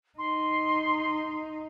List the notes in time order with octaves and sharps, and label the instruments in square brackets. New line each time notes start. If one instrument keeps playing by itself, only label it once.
[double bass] D#4 [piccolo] C6